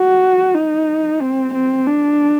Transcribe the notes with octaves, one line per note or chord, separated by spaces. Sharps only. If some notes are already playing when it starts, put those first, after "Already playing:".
Already playing: F#4
D#4
C4
C4
D4